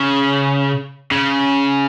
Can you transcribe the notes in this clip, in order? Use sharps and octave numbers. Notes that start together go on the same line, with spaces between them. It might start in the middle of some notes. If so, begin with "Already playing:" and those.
Already playing: C#3
C#3